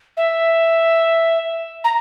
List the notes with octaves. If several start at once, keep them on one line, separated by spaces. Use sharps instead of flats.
E5
A#5